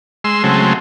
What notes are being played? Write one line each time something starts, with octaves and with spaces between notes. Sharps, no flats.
G#3 C6 E6
C#3 F#3 G#3 A3 C4